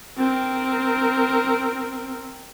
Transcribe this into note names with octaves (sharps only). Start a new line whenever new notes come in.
C4 A#4